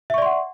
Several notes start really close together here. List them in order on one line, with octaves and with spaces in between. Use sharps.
E5 C#6 D5 C6 F#5